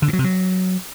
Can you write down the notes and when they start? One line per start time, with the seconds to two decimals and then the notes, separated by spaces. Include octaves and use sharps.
0.02 D3
0.08 G2
0.13 F#3
0.19 C3
0.24 F#3